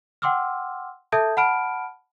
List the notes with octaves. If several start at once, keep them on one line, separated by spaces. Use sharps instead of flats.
F#5 G5 C6 D6 E6 F6
A4 E5 A5 D#6 G6 G#6
F#5 A5 B5 F6 D7